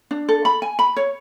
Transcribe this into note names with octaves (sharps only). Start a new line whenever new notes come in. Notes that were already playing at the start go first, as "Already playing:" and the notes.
D4
A4
B5
G#5
B5
C#5